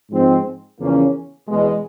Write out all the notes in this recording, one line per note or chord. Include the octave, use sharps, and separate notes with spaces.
G#2 F3 G#3 C4
E2 C#3 F3 A#3 C#4
E2 B2 G#3